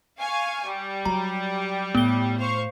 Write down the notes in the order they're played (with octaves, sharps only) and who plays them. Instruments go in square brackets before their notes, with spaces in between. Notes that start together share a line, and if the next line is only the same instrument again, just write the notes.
[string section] F5 G#5 C#6
G3
[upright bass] F#3 [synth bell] A#5
[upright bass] A2 [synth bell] B3 G7
[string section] C5 F5 C#6